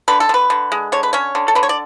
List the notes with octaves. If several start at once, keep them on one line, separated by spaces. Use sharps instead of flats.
D3 B4
A4
D3 B4
D3
G#3
D3 C#5
B4
C#4 C#5
D3
A4
D3 B4
C#5
D5